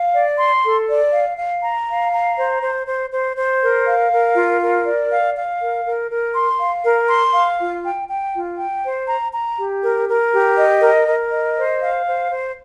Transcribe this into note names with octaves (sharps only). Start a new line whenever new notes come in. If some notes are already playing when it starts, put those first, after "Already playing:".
Already playing: F5
D5
C6
A4
D5
F5
F5
A#5
F5
A#5
C5
C5
C5
C5
C5
A#4
F5
A#4
F4
A#4
D5
F5
F5
A#4
A#4
A#4
C6
F5
A#4
C6
F5
F4
G5
G5
F4
G5
C5
A#5
A#5
G4
A#4
A#4
G4
D#5
A#4
A#4
D#5
C5
F5
C5
C5